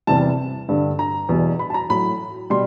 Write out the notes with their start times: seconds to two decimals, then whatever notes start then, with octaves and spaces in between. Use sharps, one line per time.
0.07 E2 C3 E3 G3 A5
0.69 G2 D3 G3
0.99 A#5
1.29 E2 B2 G3
1.59 B5
1.70 A5
1.74 A#5
1.89 A2 F#3 B5
2.50 B2 G3 C6